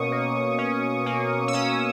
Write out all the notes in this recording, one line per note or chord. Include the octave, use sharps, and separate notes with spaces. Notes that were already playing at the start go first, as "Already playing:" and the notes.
Already playing: B2 A#3 C#4 C#6 D#6
A#3
C#4
A#3
E6
C#4 D#6